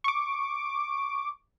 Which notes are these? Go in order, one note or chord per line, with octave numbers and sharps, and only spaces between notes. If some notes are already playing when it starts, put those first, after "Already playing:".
C#6 D6